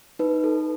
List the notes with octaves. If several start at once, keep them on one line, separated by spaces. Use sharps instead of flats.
D#4 B4
A4